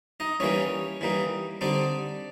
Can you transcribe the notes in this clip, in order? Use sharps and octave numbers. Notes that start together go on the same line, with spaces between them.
D#4 D#5
E3 G3 A#3 C#4 D#4 C#5
E3 G3 A#3 D#4
D3 G3 C4 D4 D#4 D5